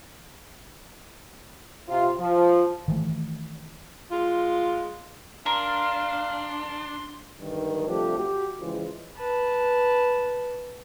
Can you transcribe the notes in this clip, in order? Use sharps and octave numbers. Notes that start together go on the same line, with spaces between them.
C3 F4
F3
D#3 E3 A3
G#3 F4
D4 A#4 F5 C6
B1 G2 D3 D#3
C3 F3 G3 A3 D4 G4
F#4 G4
C#3 E3 F3 G#3
B4 A5